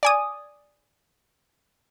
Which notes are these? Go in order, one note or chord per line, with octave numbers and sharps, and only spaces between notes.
D5 G#5 D#6